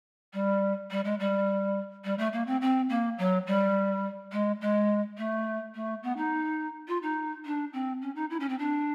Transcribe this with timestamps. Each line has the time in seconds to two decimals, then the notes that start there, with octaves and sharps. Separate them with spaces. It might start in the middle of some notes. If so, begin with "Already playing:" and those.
0.33 G3
0.91 G3
1.05 G#3
1.20 G3
2.05 G3
2.18 A3
2.33 A#3
2.47 C4
2.61 C4
2.89 A#3
3.18 F#3
3.47 G3
4.32 G#3
4.61 G#3
5.18 A3
5.75 A3
6.03 B3
6.17 D#4
6.88 F4
7.02 D#4
7.45 D4
7.73 C4
8.02 C#4
8.15 D#4
8.30 E4
8.40 C#4
8.49 C4
8.59 D4